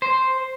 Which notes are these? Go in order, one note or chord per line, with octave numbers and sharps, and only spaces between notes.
C5